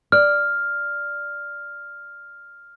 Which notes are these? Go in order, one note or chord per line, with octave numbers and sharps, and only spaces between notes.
D5 F6